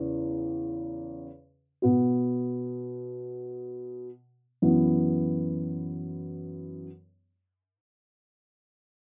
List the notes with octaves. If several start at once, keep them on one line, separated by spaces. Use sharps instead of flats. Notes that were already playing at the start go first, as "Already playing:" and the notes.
Already playing: E2 C#3
B2 B3 F#4
F#2 E3 B3